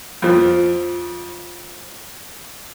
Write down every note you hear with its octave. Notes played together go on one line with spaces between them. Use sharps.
F2 F3